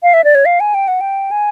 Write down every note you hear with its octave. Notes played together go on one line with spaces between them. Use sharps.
F5
E5
D5
C#5
F5
G#5
G5
F#5
G5
G#5